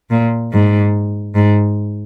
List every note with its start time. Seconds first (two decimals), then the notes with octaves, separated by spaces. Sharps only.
0.10 A#2
0.53 G#2
1.36 G#2